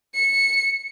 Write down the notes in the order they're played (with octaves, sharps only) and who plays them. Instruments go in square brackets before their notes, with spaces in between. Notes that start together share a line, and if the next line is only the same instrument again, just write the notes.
[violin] C#7